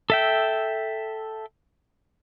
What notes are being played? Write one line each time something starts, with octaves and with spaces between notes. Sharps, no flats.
A4 E5 G5